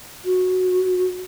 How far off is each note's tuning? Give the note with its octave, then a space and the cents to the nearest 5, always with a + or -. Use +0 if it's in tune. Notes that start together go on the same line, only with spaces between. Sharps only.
F#4 -10